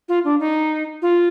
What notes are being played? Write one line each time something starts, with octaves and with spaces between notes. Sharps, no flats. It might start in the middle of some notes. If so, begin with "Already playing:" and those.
F4
D4
D#4
F4